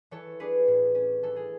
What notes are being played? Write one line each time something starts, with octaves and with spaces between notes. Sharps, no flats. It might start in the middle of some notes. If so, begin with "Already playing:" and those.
E3 A4 C#5
D4 G#4 B4
A2
C#4
E3 A4
G#4